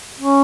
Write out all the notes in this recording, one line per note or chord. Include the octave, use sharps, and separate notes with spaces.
C#4